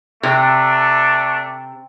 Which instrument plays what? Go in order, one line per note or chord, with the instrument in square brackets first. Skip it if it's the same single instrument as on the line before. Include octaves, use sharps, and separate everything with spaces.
[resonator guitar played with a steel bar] C3 [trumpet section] A3 D4